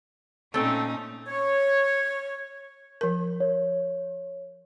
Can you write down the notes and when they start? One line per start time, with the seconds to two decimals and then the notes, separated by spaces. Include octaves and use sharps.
0.54 A#2 A3 C4 C#4 D#4 A4
1.27 C#5
3.01 F3 A#4
3.40 C#5